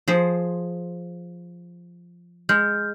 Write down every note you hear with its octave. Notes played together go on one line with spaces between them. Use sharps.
F3 G#4 C5
G#3 F6 G6